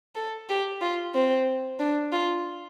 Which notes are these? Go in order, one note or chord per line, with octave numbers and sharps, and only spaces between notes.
A4
G4
F4
C4
D4
F4